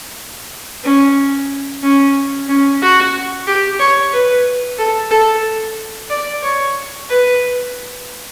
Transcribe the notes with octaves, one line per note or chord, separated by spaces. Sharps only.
C#4
C#4
C#4
F#4
G4
C#5
B4
A4
A4
D5
C#5
B4